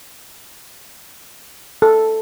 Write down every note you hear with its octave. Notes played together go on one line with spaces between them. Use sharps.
A4